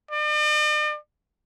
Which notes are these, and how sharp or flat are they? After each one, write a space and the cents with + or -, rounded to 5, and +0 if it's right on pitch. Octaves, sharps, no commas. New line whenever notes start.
D5 +45